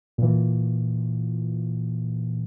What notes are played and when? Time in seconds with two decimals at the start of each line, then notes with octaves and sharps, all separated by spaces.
0.18 A#2 E3